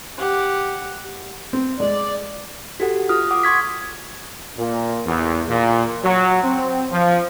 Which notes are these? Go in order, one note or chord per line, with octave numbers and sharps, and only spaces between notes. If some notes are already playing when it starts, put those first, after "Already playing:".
G4 F#5
C4
G#3 D5
F#4 G4 A4 F#5
F4 D#6 F6
F#5 D6 D#6
C6 C#6 G#6 B6
A#2
E2
A#2
F#3
C4
F3